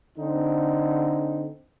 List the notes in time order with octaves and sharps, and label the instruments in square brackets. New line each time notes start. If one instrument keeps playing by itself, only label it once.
[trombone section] D3 C4 D#4